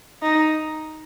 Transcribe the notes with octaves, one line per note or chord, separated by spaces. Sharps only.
D#4